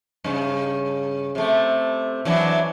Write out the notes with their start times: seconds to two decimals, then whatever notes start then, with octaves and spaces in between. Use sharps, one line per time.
0.24 G2 C#3
1.35 C3 A3
2.25 E3 F#3 D4